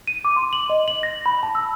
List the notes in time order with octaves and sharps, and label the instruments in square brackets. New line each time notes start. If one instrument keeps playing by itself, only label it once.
[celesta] D#7
D6
C6
F#7
D#5
F#7
A#6
B5
A5
E6